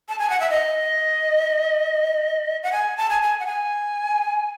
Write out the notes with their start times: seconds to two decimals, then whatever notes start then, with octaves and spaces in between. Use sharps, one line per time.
0.09 A5
0.19 G#5
0.30 F#5
0.40 E5
0.50 D#5
2.63 F#5
2.72 G#5
2.97 A5
3.10 G#5
3.22 G#5
3.40 F#5
3.47 G#5